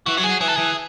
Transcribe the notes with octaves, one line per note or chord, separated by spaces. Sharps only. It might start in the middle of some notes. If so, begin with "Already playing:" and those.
E3 F#4
F#3 F#4
G#4
F#3
E3 G#4
A4
E3 G#4